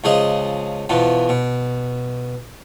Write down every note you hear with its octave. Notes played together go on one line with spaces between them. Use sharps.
C#2 F3 G#4 D#5
E2 B2 F3
B2